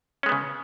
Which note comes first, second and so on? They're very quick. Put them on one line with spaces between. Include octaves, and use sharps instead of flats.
C#4 G#3 B3 C#3